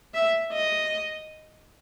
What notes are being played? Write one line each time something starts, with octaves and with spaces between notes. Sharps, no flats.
E5
D#5